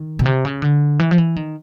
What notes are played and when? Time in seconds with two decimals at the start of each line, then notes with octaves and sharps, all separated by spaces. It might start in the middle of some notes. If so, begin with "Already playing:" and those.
Already playing: D#3
0.19 B2
0.25 C3
0.45 C#3
0.62 D3
0.99 E3
1.11 F3
1.18 E3
1.36 D#3